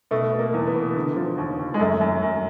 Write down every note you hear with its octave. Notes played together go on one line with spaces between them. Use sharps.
B2 A3
B2
A#3
E2
B3
B2
D3
F3
D#2
D#2
G#3
F#2 A3
F#2
F#2